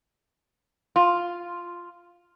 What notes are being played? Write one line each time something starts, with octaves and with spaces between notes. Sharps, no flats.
F4